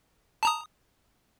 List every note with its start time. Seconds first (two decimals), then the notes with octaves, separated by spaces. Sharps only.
0.43 A5 A#5 D#6